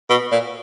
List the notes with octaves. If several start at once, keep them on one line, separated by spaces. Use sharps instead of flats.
B2
A#2